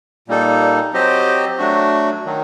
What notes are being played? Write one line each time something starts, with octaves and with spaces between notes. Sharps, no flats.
A#2 G3 A#3 D#4 A4
F#3 C4 G4 C5 D#5
F#3 A3 D4 F#4
D#3 F#3